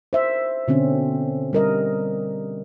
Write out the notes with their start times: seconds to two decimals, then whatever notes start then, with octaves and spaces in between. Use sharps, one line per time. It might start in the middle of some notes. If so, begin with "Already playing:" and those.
0.13 C5 E5
0.68 B2 D3 C4 C#4
1.53 G3 A#4 D#5